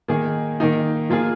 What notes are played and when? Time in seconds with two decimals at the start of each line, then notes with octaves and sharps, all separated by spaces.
0.08 D#3 A#3 D#4 G#4
0.60 D#3 A#3 D#4
1.09 F3 A#3 F4 G#4